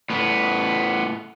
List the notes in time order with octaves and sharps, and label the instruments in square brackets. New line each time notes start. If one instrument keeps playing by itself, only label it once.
[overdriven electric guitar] A2 B3